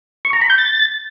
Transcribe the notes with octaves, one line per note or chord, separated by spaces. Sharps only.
C#6
A#5
B5
G6
A6